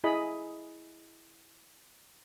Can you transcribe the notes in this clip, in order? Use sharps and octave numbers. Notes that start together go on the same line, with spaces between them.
E4 G#4 D#5 B5